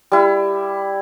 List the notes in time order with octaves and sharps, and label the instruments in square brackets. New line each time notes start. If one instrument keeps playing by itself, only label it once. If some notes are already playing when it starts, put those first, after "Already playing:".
[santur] G3 E4